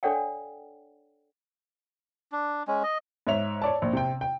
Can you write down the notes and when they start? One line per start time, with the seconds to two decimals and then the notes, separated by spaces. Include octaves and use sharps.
0.03 D4 A4 C#5 D5 F#5 G5
2.32 D4
2.68 G#3 C#4
2.83 D#5
3.27 G#2 C#5 E5 F7
3.62 C#5 D5 A5
3.82 A#1
3.93 C3 G5
4.21 G5